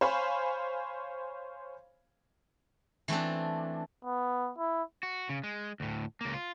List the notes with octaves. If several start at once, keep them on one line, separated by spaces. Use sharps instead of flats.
C5 C#5 F5 G#5 B5
E3 A3 C4 D4
B3
E4
F#4
C#3
G#3
D2 A2
C#2 A#3
F4